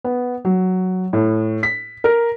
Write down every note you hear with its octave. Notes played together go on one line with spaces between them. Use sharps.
B3
F#3
A2
B6
A#4